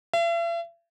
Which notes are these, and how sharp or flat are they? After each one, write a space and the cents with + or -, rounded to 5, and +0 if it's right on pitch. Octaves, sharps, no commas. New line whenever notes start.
E5 +45